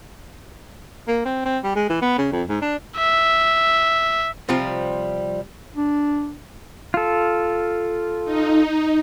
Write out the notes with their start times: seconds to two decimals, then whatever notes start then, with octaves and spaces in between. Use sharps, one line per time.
1.08 A#3
1.25 C4
1.45 C4
1.64 G3
1.75 G#3
1.89 E3
2.02 B3
2.18 C#3
2.32 F2
2.49 G#2
2.62 D4
2.97 E5
4.49 C3 F3 G3 C4 F4
5.76 D4
6.94 F4 A4
8.24 D#4